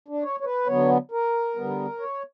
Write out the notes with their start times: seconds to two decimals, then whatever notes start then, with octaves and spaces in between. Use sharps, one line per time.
0.08 D4
0.23 C#5
0.40 C#5
0.45 B4
0.66 D3 F#3 B3 C#5
1.11 A#4
1.55 D3 G3 B3
1.99 C#5